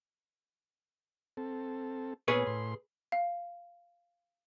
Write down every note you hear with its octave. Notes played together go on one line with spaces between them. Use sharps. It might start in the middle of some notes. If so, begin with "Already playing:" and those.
C4 A4
A#2 B3 G#4 B4 C#5 G#5
A2 C6
F5